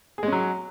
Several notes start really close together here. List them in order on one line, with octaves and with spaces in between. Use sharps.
G#4 G#3 C#4 F#3